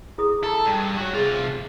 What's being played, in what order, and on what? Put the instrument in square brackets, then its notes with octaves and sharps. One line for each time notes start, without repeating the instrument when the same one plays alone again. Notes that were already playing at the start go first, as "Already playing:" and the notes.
[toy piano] E4 G#4 D#6
[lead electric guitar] A4 [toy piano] A#5 E6
[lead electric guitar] G2
F#4 C#5
[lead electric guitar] C3 F4 [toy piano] G#4